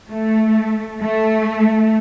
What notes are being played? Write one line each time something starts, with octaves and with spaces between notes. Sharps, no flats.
A3
A3